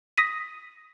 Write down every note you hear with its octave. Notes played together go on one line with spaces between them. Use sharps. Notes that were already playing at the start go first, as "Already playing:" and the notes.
D#6 A#6 B6 D#7